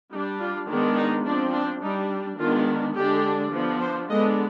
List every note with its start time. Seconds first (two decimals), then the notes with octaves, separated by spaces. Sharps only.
0.13 G3 D#4
0.17 D4
0.41 F4
0.69 D#3 G#3 B3 D4
0.97 D#4
1.26 F3 C4 D4
1.54 D4
1.83 G3 D4 D#4
2.39 D#3 G#3 B3 D4 F4
2.96 D3 G#3 D4 G4
3.53 F3 B3 D4
3.81 C5
4.10 D3 G#3 B3 D4 D#5